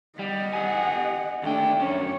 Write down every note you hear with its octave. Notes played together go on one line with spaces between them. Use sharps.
G3 D#5 F#5
G4 G#5
D#2 A3 D4 G5
F#2 C#4 C#5